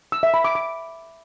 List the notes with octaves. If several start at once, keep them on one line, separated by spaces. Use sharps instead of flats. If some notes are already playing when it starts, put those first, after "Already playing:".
E6
E5
B5
D6
D6